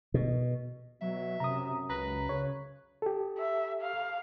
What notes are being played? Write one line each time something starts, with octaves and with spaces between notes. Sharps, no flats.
B2
B2 F#3 E5
F#2 C3 A#5 D#6
C#2 B4 A#5
C#3 C#5
G4 A4
E5
F5